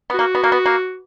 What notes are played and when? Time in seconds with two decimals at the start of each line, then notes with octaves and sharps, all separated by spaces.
0.10 B3
0.14 A#3 F#4
0.35 B3
0.44 A#3
0.52 B3
0.66 A#3